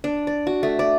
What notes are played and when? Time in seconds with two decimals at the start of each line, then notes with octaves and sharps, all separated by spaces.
0.04 D4
0.27 D5
0.47 F#4
0.63 A3
0.79 D5